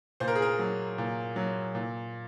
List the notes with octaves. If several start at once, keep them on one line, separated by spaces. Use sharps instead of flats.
A#2 C5
A#4
G#4
A#4
F#3
A#2
F#3
A#2